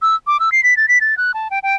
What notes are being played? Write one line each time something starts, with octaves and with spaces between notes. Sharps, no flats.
E6
D6
E6
C7
B6
A6
B6
A6
F#6
A5
G5
G5